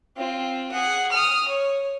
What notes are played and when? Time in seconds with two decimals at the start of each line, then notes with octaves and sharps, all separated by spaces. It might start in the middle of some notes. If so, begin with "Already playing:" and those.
0.17 C4 F4
0.71 G#4 F#5
1.11 D#6 F6
1.48 C#5